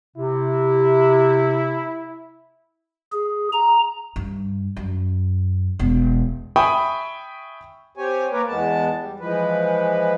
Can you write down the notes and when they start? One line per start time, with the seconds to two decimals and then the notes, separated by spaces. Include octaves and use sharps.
0.17 C3 E4
3.12 G#4
3.53 A#5
4.16 G2
4.77 F#2
5.79 E1
6.56 E5 G5 G#5 B5 C#6 D#6
7.97 C4 G4 C#5 G#5
8.32 A#3 A#4 B4 C#5 D5
8.48 E2 G#3 B3 A5
8.98 G3
9.20 E3 F3 G#3 B4